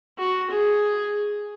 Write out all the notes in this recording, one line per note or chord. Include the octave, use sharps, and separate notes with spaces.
F#4
G#4